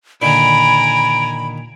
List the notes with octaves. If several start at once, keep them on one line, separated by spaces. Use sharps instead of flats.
A#2 D3 D#3 G#5 A#5 B5 D7